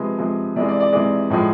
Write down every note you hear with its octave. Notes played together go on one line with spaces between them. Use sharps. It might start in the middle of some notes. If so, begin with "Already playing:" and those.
Already playing: C3 F3 G#3 B4
C3 F3 G#3
C3 E3 G#3 D5
D5
D5
C3 E3 G#3 D5
A2 F3 G#3